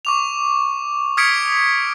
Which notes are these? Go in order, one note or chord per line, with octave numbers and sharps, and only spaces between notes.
C#6 D6 F7
D#6 F6 G#6 B6 C#7 D7